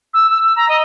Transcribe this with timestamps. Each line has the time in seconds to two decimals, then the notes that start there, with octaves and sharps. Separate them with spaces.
0.14 E6
0.30 E6
0.43 E6
0.56 A#5
0.69 D#5